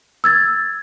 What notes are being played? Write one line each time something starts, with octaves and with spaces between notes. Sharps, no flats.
E6 G#6 A6